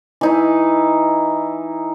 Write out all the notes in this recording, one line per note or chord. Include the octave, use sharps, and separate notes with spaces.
E3 D#4 E4